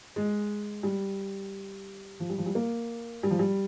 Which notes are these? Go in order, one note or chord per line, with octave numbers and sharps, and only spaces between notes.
G#3
G3
F3
G3
F3
G3
A#3
G3
F3
G3